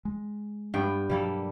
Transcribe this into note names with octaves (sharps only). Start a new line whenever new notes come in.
G#3
G2 B3 G5
B2 F#3 G3 A#3 A4